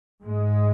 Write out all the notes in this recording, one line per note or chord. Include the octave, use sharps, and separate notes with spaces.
G#2 G#3